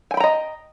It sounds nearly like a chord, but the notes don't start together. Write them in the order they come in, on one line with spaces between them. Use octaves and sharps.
G#5 G5 B5 A#5 D#5